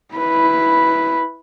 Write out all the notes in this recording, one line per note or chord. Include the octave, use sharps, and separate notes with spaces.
E4 B4